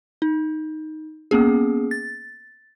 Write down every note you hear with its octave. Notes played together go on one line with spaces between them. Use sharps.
D#4
A#3 B3 C#4 G#4
A6